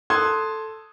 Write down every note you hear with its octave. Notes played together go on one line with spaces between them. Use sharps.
A4 A5 C6 D#6 F#6 G#6